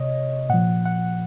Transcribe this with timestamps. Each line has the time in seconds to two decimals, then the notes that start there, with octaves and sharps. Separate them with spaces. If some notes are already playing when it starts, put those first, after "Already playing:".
Already playing: C3 C#5 D#5
0.49 A#2 F3 F#5
0.85 F#5